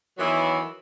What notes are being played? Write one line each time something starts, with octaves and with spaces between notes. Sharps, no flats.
D#3 E3 F#3 B3 E4